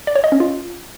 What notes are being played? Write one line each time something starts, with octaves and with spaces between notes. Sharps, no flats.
D5
C#5
D#5
C#4
F4